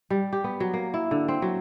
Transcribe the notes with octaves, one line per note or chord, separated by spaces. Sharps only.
G3
G4
B3
F#3
A#3
E4
D3
C4
F#3